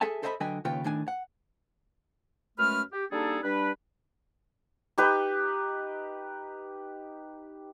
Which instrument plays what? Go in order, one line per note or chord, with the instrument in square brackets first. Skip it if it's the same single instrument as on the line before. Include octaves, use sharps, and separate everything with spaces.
[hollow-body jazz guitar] G#4 A4 E5 G#5 A5
A4 C5 D#5 E5 G#5 B5
D3 F#3 B4 D#5 G5 G#5
D#2 C#3 F4 B4 C#5 G5
A2 D#3 D4 G#5
F#5
[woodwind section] F#2 G#3 A3 C#4 B4 F6
G4
G3 A#3 D4 D#4 G#4 A4
G3 D4 B4
[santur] D#4 G4 B4